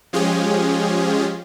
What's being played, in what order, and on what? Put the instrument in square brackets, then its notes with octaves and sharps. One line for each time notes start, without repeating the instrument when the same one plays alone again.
[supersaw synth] F3 G#3 C#4 F4 G4 G#4